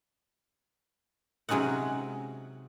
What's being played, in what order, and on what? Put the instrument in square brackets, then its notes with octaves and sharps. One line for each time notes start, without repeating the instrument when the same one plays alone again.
[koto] C3 F#3 G#3 C#4 D#4 F#5